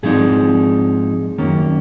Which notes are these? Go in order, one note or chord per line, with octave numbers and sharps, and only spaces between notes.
G#2 F3 C4 D#4 G#4
F#2 D#3 A#3 C#4